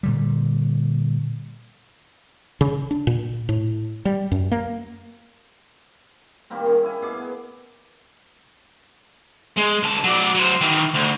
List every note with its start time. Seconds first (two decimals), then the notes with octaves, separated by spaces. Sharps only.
0.03 A#2 D3 G3
2.61 C#3
2.91 D4
3.07 A#2
3.49 A2
4.05 G3
4.32 F#2
4.52 A#3
6.50 D#3 G3 A#3 C4
6.66 G3 C#4 G#4
6.83 E4 G#5
7.01 B2 G#4 D6
7.19 B3
9.58 G#3
9.83 C#2 A5
10.04 F#3 D5
10.35 F#3 C5
10.61 D#3 E3
10.94 D2